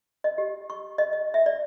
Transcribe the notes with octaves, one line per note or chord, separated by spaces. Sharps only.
D#5
G4
C#6
D#5
D#5
E5
D5